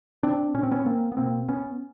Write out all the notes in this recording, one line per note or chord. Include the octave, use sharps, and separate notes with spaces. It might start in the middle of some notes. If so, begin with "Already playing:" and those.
C4 D4
A#2 C#4
C4
B3 C#4
A#3 C4
B3
B2 A#3 C4
B3 C#4